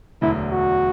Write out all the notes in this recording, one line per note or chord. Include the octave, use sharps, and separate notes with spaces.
E1 D2 D3 F#3 E4
F#4